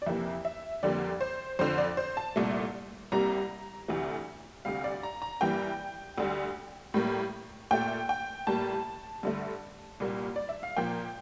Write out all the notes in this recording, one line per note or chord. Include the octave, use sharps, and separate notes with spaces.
D5
F2 C3 E3 A#3 E5
E5
F2 D3 G3 A#3 D5
C5
F2 D3 F3 C5
D5
C5
A5
C2 A#2 A3
C2 C3 G3 A#3 A#5
D2 C3 E3 A3
D2 C3 G3 F5
D5
A#5
A#5
G2 E3 G3 A#3 G5
D2 D3 G3
A2 G3 A#3
A#2 A3 G5
G5
A2 G3 A#3 A5
G2 D3 A3
C2 A#2 G3 A#3
D5
E5
F5
A#2 F3 A#3 G5